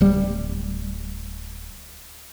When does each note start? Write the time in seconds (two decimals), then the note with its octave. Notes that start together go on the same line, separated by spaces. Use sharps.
0.01 D1 G3